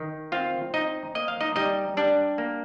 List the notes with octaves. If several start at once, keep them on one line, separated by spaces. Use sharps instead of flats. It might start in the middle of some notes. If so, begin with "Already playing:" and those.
Already playing: D#3
C4 F4 F5
C4 D#4 D#5
A#3 D#5
F5
D#4 D#5
G3 D#4 D#5
G3 D4 D5
A#3